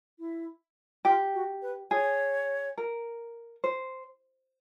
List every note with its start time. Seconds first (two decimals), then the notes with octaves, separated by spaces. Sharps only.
0.19 E4
1.05 F4 G4
1.34 F#4
1.62 B4
1.91 G#4 C#5
2.78 A#4
3.64 C5